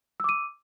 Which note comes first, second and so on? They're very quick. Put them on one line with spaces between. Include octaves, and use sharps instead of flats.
E6 D6 D#7